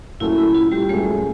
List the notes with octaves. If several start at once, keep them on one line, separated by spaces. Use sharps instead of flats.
A#2 F#3 A3 C#4 E4
E4
F4
G3 G4
A#2 F#3 G#3 A3 C#4 G#4